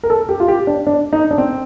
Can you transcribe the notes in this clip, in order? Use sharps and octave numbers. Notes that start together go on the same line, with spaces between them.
A#4
A4
G4
F4
G4
D4
D4
D#4
D4
C4